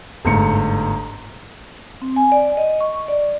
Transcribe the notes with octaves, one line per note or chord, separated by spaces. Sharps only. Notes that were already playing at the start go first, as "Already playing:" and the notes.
G1 G#2 A3 C#7
C4
G#5
D5
D#5
C#6
D5